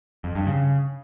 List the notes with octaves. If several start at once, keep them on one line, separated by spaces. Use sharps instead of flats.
F2
G2
C#3